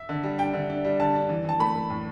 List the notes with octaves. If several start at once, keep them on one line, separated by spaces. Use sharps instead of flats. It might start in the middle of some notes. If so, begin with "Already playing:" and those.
Already playing: E5
D3
G3
D4 G5
D3
D4
G3
D3 A5
D4
E3
E3 A5
A3 B5
A3
A2